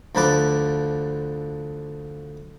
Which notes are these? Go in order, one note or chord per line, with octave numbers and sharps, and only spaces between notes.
D2 D3 F3 B4 A5 D6